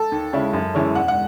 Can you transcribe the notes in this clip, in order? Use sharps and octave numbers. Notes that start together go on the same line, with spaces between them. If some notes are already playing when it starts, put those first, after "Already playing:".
Already playing: A4
D#2
C#3 G#3 C#4 E4
F#2
E3 G#3 C#4
E1 F#5
F#5